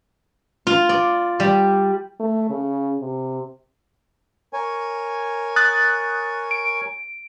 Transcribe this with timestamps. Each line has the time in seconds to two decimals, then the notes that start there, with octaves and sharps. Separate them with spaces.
0.67 F4
0.89 D5
1.40 G3
2.20 A3
2.50 C#3
3.01 C3
4.53 A#4 C#5 G#5
5.56 D#6 F#6 A6
6.51 D7